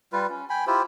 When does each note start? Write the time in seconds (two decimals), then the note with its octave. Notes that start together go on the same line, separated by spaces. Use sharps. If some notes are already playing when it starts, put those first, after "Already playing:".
0.13 G3 F4 B4
0.30 C#4
0.50 G5 G#5 B5
0.67 E4 F4 G4 C5